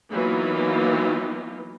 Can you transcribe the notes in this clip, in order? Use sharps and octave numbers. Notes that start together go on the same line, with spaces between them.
E3 F#3 A#3 B3 D#4 F4